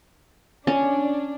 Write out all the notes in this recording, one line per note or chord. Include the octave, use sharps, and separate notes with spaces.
C#4 D4